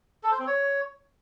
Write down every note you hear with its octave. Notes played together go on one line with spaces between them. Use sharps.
A4
C5
C4
C#5